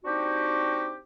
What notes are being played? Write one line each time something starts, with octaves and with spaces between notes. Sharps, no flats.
C4 D4 D#4 F#4 G4